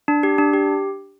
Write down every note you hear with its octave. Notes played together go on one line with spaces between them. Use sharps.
D4
G4
D4
G4